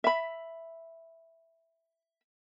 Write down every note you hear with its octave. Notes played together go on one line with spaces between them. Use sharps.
E5 B5